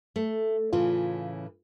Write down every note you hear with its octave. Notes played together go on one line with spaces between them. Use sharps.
A3
A2 C#3 E3 F4